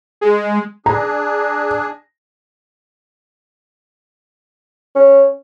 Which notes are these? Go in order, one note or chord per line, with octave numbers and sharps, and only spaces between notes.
G#3
D4 G#4 A#5
C#4